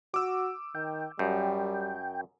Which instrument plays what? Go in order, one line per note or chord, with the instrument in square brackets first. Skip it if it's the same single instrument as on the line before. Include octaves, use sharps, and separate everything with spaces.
[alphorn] F#4 [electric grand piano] D6 E6
[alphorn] D#3 [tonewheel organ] G5
[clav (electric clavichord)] F#2 [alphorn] G3 [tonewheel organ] G5